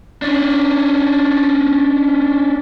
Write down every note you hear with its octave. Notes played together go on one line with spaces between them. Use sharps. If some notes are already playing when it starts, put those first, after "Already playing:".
C#4 D4